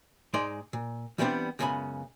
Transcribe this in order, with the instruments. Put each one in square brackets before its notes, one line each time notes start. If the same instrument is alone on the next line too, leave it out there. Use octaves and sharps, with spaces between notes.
[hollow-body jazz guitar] G#2 G#3 D#4 D5 C6
A#2
E3 G3 A3 B3 C4 D4
C#2 F#2 C#3 B3 G#5 B5